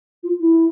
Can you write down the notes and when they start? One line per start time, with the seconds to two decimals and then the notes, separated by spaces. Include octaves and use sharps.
0.23 F4
0.41 E4